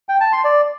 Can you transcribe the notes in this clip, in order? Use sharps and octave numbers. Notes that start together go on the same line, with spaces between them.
G5
A5
C6
D5